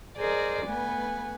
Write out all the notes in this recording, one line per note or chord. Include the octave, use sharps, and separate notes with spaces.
G#4 A#4 C5 D5 D#5
A3 B3 B4 G#5